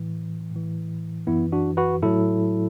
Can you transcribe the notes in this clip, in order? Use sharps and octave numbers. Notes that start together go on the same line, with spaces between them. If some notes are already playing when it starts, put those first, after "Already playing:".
Already playing: A2 E3
A2 E3
F#2 E3 B3 E4
D4 F#4
F#4 B4
A2 F#3 E4 A4